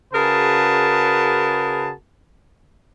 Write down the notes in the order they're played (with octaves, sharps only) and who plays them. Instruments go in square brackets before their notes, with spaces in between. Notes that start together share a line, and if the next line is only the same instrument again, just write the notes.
[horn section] C#3 F#4 G#4 A#4 B4 A5